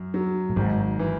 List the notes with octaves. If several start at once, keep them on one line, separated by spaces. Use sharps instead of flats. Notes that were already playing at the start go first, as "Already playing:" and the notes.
Already playing: F#2
F#3
A2
G#1 G#2
E3